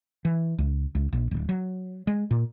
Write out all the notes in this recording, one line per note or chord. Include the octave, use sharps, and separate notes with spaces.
E3
C#2
C#2
A#1
D1
F#3
G#3
A#2